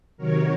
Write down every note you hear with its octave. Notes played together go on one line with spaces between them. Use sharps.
C3 D#3 F#3 A#4 C#5